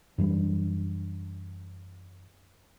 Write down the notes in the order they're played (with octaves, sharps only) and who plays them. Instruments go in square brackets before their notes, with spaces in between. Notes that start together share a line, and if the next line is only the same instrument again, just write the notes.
[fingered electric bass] F#2 E3 G3 D4